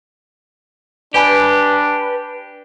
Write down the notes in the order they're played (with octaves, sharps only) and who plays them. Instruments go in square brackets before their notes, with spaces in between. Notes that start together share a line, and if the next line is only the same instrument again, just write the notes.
[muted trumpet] D4 [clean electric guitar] G4 [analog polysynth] B4 [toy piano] D5 G#5 B5